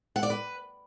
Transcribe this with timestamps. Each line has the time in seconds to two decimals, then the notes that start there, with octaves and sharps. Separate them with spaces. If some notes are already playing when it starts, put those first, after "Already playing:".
0.16 F#5
0.23 D5
0.30 B4